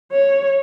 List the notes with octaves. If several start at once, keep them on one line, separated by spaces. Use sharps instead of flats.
C#5